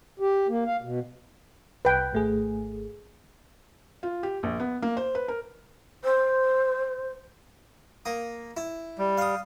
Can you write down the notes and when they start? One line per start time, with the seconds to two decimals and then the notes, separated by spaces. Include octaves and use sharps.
0.20 G4
0.48 A#3
0.66 F5
0.82 B2
1.85 C2 B4 G5
2.13 G#1 A3 G#4
4.03 F4
4.23 G4
4.43 A#1
4.60 B3
4.82 A#3
4.97 C5
5.15 B4
5.28 A#4
6.03 C5
8.05 A#3 D#6
8.57 E4
8.98 G3
9.18 F5 D#6